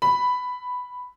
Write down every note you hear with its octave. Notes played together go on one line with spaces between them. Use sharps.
B5